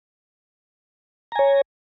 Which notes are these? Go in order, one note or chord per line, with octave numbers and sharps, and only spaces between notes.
C#5 G#5 A#5